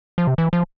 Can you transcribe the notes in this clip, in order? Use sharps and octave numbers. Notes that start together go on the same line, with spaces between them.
F3
C3
E3
F3